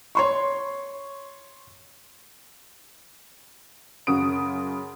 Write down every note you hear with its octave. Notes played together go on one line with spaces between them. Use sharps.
C#5 C6 C#6
F#2 C#3 F#4 D#6 D7